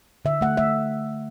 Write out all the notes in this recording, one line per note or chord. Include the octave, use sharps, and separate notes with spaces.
D3 E5
A3 F#5
A3 E5